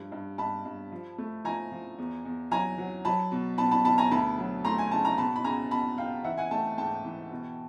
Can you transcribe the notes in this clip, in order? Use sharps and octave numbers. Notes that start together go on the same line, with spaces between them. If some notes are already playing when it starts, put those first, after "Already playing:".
Already playing: G2 F3
G2
G2 A5 B5
G2
F3
A3
F3 G#5 A#5
F3
E2
E2
F#3 G#5 A#5
F#3
F#3 A5 B5
B2
B2 A5 B5
A5 B5
B2 A5 B5
G#5 A#5
D2 A5 B5
F#3
A3 A#5 C6
G#5
C#3 A5
A#5
B2 A5 B5
B5
C#2 G#5 A#5
B2 A5 B5
C#2 F5 G5
E3 E5 F#5
F#5 G#5
A3 G5 A5
G#2 G5 A5
E3
B2